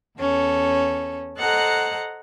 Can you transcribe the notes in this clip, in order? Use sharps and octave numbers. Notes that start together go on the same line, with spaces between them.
E2 C#4 A4
A4 C5 D#5 F#5 A#5 F#6